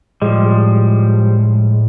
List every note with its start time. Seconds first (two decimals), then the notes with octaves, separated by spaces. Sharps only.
0.22 A2 F3 G3 G#3